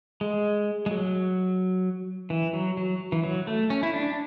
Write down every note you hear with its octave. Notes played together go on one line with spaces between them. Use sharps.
G#3
G#3
F#3
E3
F#3
F#3
E3
F#3
A3
C#4
E4
D4